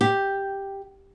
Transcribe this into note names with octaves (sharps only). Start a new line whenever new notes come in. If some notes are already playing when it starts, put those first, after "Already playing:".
G4